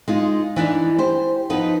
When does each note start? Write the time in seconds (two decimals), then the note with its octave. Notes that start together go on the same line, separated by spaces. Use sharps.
0.08 G#3 D#4 F4
0.56 E3 D4 D#4
0.99 G4 C5
1.50 F3 B3 D#4 B4